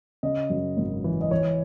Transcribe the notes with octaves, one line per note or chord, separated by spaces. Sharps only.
C#3 D#5
F#2
G#1
E3
D#5
E3 C#5